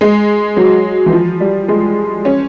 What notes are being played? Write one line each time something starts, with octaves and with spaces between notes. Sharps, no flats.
G#3
F#3
E3
F3
G3
G#3
C#4